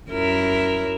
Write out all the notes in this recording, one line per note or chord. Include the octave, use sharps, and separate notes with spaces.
F#2 E4 A#4